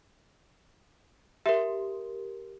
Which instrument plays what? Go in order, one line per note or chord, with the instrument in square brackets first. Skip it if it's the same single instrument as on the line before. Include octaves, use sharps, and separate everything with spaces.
[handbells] G4 A#4 [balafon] E5